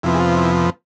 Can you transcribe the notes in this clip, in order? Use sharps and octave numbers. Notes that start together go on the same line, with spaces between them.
F2 C3 F3 B3 E4
G#4
F4
E4